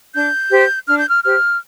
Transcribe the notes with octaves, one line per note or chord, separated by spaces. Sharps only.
D4 G6
G4 C5
D4 F6
G6
F6
G4 C5 F6